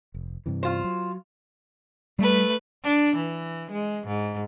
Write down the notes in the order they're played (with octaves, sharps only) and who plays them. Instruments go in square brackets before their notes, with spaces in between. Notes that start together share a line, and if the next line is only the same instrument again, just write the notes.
[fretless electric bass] F1
G2 C3 E3
[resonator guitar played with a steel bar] F4 C5
[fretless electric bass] F#3
[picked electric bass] G3 [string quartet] A3 B4
[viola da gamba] D4
E3
G#3
G#2